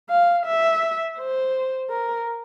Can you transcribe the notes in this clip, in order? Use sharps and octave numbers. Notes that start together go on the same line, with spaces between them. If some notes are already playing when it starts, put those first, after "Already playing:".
F5
E5
C5
A#4